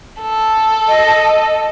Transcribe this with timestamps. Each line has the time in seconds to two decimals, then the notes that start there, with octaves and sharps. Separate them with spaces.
0.21 A4
0.88 D#5